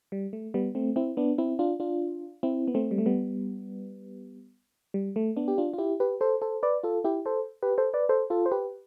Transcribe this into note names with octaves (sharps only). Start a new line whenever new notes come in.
G3
A3
G3 B3
A3 C4
C4 E4
B3 D4
C4 E4
D4 F4
D4 F4
C4 E4
B3
A3 C4
G3
A3
G3 B3
G3
A3
B3 D4
G4
D4 F4
F4
E4 G4
G4 B4
A4 C5
A4 C5
B4 D5
F4 A4
E4 G4
A4 C5
G4 B4
A4 C5
B4 D5
A4 C5
F4 A4
C5
G4 B4